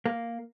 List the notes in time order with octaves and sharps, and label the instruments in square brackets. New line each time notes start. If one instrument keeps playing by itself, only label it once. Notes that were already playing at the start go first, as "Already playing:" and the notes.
[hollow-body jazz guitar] A#3